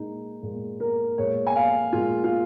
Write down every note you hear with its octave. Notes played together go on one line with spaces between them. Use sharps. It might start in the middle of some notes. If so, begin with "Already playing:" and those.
Already playing: A#2 G#3 D#4
A#2 G#3
A#4
A#2 G#3 C#5
G#5
F5
A#2 G#3 F4
F4